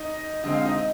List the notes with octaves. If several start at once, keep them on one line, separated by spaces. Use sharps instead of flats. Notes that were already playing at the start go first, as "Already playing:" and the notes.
Already playing: D#4 D#5
D3 G#3 C4 D#5
F5
D#4 D#5
D#5